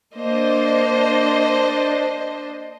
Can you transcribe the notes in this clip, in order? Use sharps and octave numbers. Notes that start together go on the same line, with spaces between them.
A#3 D4 C5 D#5